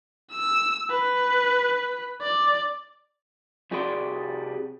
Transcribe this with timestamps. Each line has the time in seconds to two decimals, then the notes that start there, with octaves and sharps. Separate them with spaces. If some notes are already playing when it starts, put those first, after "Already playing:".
0.32 E6
0.90 B4
2.22 D5
3.71 C2 G3 F#4 G#4 D5 C6